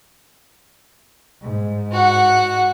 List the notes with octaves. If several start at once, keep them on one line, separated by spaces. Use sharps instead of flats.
G#2
F#4 F#5